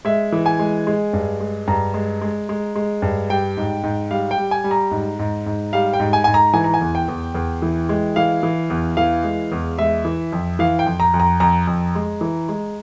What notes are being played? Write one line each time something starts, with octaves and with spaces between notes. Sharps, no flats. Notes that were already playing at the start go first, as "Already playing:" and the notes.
G#3 E5
E3
G#5
G#3
G#3
G2
G#3
G2 A#5
G#3
G#3
G#3
G#3
G2
G3 G5
G#2
G#2
G3 F5
G5
G3
G#5
G3
A#5
G#2
G#2
G#2
G3 F5
G5
G#2
G#5
G#2 G#5
A#5
E3 G#5
A#5
G#5
E2
G5
E2
E2
E3
G#3
E3 F5
E3
E2
E3 F5
G#3
E2
G#3 E5
E3
F2
E3 F5
G5
F2
A#5
F2
A#5
F2 A#5
F2
G#3
E3
G#3